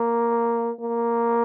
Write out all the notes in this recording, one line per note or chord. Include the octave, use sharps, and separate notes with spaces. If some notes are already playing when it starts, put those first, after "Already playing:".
Already playing: A#3
A#3